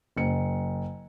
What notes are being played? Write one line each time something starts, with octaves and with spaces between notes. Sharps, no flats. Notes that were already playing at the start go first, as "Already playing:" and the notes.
F#1 C#7